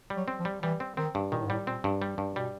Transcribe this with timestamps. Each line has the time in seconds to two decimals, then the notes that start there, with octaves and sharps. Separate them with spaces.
0.10 G3
0.16 F#3
0.28 C4
0.40 F3
0.45 G3
0.63 E3 G3
0.80 C4
0.97 D#3 C4
1.15 G2
1.32 A#2 D#3
1.39 A2
1.47 G#2
1.50 A2 G3
1.66 A#2 C4
1.84 G2
2.02 G3
2.18 G2
2.36 B2 G3